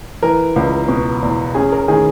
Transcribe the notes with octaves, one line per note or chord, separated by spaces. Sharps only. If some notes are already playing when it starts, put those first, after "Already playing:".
E3 A#4
C#2
B2
E2
C#4 G#4
A#4
D#3 G#4